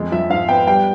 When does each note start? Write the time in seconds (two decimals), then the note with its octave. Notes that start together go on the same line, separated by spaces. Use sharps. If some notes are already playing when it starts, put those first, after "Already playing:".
Already playing: F2 G#3
0.12 F3 E5
0.30 G#2 F5
0.48 B3 G5
0.67 G3 G5